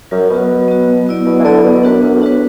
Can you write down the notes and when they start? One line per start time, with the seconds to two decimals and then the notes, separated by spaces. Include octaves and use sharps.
0.11 F#2 F#3
0.30 B2 B3 F#4
0.49 F#3
0.68 B3 F#4
0.88 F#3
1.06 B3 E4 D5
1.26 B2 F#3
1.40 E3
1.45 D3 B3 E4 D5
1.64 B2 B3
1.83 F#2 D4 F#4 B4
2.02 F#2 B3
2.15 A2
2.21 D4 F#4 B4